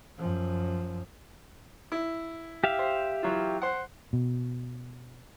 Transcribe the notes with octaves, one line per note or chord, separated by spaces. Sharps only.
F#2 F3
E4
G4 E5 F5
C5
E3 F#3 F4
C5 F#5
B2